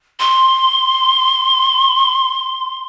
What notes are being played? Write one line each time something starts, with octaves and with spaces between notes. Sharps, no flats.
C6